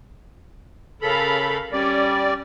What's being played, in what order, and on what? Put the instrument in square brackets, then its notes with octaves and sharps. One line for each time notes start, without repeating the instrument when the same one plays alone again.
[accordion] C#3 A4 B5 [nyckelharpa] A#4 F5
[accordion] G3 D5 [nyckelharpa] C#4